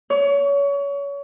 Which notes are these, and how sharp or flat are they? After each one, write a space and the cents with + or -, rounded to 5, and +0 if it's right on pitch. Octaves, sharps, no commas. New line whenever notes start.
C#5 +30